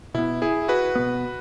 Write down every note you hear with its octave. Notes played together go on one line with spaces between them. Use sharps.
B2 B3 E4
E4 G#4
F#4 B4
B2 B3